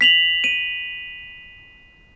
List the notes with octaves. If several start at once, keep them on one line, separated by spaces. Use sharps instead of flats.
B6 F7 F#7
D#7